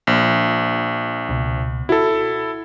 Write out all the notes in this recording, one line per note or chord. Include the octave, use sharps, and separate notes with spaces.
A#1
C#2 B2
E4 F#4 A4